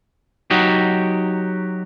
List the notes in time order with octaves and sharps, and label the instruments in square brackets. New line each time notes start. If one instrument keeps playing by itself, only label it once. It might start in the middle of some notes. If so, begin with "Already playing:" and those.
[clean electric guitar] F#3 D#4 F#4 G4